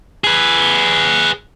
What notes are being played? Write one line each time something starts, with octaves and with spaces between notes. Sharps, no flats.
G#4 B4